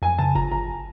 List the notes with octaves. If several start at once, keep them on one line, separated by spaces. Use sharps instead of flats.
F2 G#5
C#3 A5
G1 A#5
G1 A#5